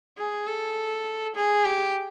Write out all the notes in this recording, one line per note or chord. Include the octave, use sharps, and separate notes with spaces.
G#4
A4
G#4
G4